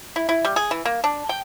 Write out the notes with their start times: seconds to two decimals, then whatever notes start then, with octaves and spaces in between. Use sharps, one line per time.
0.16 E4
0.29 E4
0.45 G3
0.56 G#4
0.71 E3
0.85 A#3
1.04 D4
1.29 G5